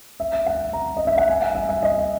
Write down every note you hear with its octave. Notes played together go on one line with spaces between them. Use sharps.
E5
E5
F#5
A#5
D#5
E5
F#5
G#5
F#5
E5
E5
D#5